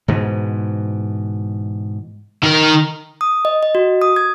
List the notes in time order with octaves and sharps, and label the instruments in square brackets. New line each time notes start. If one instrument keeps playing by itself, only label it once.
[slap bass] G#2 B2 E3
[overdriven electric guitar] D#3 A#4
[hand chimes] D#6
D#5
D#5
F#4
D#6
G#6